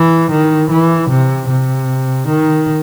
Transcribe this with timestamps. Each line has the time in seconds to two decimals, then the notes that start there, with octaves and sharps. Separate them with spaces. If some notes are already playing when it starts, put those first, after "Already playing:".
Already playing: E3
0.31 D#3
0.70 E3
1.09 C3
1.49 C3
2.28 D#3